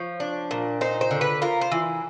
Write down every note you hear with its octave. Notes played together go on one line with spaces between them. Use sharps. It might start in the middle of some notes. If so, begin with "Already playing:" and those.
Already playing: F3 C#5
D4
A#2
D#4 C5
C5
D3
B4
F4 A#4
C5
E3